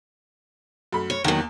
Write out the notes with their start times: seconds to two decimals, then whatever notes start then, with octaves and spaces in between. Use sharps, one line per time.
0.93 F#2 A3 B5
1.10 C#5
1.24 E2 D#3 F#3 A#3